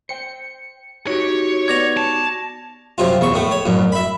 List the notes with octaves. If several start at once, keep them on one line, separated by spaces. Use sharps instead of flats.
C5 G5 C#7
D#4 F#4 G4 C#5
B3 D5 C#6 G#6 A#6 F7
A5
F#2 C3 F4
E2 C#6
A2 A3
C#5
A1 F#2
E5 B5